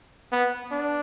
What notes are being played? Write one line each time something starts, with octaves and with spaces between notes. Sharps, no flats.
B3
D4